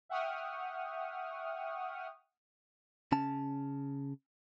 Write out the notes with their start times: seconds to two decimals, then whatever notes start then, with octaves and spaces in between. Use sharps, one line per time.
0.09 E5 F#5 G5 C#6 D#6 F6
3.12 C#3 C#4 A5